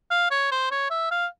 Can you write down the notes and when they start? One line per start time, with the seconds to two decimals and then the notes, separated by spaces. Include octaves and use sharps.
0.11 F5
0.31 C#5
0.52 C5
0.71 C#5
0.90 E5
1.11 F5